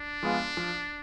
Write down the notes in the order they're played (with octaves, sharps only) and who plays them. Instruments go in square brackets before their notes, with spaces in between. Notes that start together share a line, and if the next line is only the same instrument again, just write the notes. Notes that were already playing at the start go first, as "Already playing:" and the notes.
Already playing: [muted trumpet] D4
[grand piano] F3 G#3 B3 F4
F3